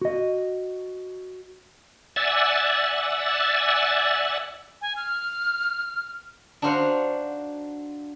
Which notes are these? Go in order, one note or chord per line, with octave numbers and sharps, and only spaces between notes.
F#4 D#5
D5 E5 F#5 G#5 E6 A6
G#5
F6
D4 D#4 F#4 C5 F5 F#5